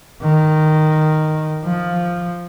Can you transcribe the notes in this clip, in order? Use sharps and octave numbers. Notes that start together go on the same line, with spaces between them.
D#3
F3